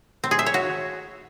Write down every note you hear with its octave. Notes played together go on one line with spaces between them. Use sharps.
C4
G#4
E5
C#5
F#4